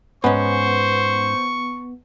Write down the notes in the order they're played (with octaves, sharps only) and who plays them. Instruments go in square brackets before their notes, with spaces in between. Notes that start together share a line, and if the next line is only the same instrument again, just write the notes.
[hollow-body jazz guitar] G#2 C#4 [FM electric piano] B3 [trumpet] C5 [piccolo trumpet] C#6